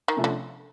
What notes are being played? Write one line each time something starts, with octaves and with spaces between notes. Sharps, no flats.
D#3
C3 F3 A3 C#4
D3